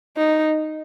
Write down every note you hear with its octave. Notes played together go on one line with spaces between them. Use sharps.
D#4